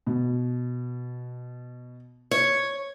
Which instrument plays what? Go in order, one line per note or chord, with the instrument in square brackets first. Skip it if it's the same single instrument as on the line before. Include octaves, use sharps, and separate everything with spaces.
[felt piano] B2
[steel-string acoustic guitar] C#5